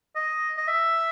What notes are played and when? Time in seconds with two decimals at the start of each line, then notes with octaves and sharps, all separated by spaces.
0.15 D#5
0.57 D#5
0.68 E5